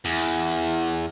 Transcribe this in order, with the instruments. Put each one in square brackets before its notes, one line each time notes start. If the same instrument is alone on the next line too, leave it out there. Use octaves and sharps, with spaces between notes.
[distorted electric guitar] E2